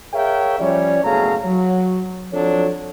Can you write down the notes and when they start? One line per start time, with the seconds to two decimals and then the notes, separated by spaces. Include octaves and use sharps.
0.13 G#4 A#4 C#5 E5 F5 G5
0.60 F3 G3 C#4 C#5 D5
1.04 F#1 B2 A3 G#4 F5 A#5
1.45 F#3
2.33 F3 F#3 C4 D4 A4 C#5